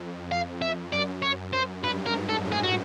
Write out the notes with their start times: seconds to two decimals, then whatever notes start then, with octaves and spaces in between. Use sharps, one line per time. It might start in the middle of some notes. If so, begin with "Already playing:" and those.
Already playing: F2
0.32 F5
0.62 E5
0.92 F#2 D5
1.22 C#5
1.53 C5
1.83 G2 B4
2.06 A#4
2.13 G#2
2.29 A4
2.45 A2
2.52 G#4
2.63 F#4